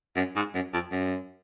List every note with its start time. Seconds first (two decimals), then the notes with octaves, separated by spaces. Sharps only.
0.16 F#2
0.36 G#2
0.54 F#2
0.73 F2
0.92 F#2